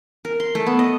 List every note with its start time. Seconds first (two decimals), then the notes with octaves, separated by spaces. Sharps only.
0.25 A#4
0.40 C6
0.55 A3
0.67 B3
0.79 D#5